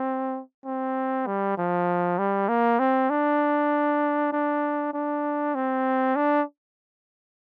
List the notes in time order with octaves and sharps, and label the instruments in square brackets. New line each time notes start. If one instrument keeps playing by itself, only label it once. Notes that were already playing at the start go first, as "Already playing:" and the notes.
Already playing: [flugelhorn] C4
C4
G3
F3
G3
A#3
C4
D4
D4
D4
C4
D4